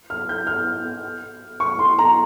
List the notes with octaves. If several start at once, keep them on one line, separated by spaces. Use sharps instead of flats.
F6
G6
F6
C#6
C6
A#5